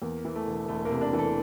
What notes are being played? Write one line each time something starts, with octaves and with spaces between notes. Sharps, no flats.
E2 A#3
E3
A3
E1
E1 A3
A#3
C3
D4
E3
A4